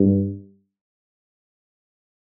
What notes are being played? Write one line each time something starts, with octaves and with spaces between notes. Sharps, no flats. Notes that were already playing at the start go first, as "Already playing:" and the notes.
Already playing: G2